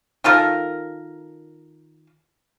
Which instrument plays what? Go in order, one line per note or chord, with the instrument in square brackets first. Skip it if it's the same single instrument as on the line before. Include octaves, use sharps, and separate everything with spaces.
[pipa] D#3 F4 A4 A#4